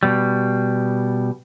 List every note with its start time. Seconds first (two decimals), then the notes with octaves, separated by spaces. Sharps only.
0.03 B2 G3